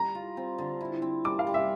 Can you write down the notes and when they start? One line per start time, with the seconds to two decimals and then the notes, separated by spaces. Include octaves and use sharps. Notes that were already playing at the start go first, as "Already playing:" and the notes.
Already playing: G3 A#5
0.15 F4
0.37 C4
0.58 D3
0.81 E4
1.02 C4
1.24 G3 D6
1.39 F5
1.47 G3
1.54 E5